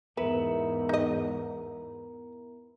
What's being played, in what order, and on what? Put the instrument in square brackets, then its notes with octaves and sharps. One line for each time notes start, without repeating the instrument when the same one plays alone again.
[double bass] E2 G#2 [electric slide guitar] B3 E4 [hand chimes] A#4 A#5 [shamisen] B4
[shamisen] D#4 D#5